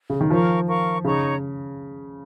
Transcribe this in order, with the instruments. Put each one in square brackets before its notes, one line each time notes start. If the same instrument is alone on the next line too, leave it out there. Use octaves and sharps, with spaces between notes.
[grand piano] C#3
D#3
[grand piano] F3 [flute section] A#4 F5 C#6
[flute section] A#4 F5 C#6
[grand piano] C#3 [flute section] D#4 C#5 A#5 C#6